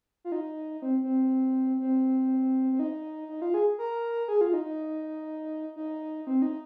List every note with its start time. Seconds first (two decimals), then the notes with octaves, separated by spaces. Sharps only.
0.25 F4
0.32 D#4
0.82 C4
1.03 C4
1.80 C4
2.72 C4
2.79 D#4
3.29 D#4
3.42 F4
3.54 G#4
3.78 A#4
4.28 G#4
4.41 F4
4.54 D#4
4.65 D#4
5.76 D#4
6.27 C4
6.42 D#4